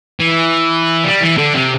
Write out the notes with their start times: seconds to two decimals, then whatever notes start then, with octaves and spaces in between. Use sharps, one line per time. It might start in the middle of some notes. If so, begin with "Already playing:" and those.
0.20 E3
1.04 G3
1.21 E3
1.37 D3
1.54 C3